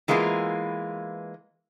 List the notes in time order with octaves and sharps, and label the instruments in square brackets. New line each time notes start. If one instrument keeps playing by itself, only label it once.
[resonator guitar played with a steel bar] E3 G#3 A#3 B3 E4 F4